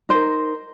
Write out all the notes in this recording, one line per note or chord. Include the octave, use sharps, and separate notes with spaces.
D#4 A#4 C5